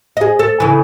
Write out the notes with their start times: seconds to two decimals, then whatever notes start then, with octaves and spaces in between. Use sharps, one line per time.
0.17 G#4 D#5
0.39 A4
0.60 C#3 E3